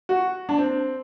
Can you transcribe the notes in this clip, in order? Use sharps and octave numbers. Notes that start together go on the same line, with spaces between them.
F#4
D4
C4